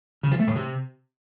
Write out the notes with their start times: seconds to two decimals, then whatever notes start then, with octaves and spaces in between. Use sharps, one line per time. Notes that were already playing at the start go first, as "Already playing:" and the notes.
0.23 C#3
0.31 F3
0.39 A3
0.47 A2
0.55 C3